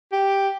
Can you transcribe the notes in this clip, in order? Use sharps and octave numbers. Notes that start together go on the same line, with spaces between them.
G4